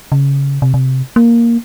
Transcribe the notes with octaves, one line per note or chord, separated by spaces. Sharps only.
C#3
C3
C3
A#3